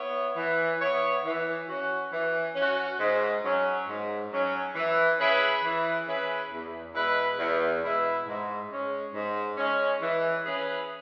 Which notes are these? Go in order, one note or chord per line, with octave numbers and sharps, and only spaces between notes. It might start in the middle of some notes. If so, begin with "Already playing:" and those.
Already playing: B3 E4 C#5
E3
B3 E4 C#5
E3
C#4 F#4
E3
C#4 F#4
G#2
F#3 C#4
G#2
F#3 C#4
E3
C#4 E4 G#4 B4
E3
C#4 E4 G#4 B4
E2
B2 G#3 E4 B4
E2
B2 G#3 E4 B4
G#2
G#3 C#4
G#2
G#3 C#4
E3
C#4 E4 G#4 B4